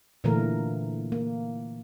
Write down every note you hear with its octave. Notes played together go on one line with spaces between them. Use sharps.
A#2 D3 E3 A3 A#3 A#4
A#3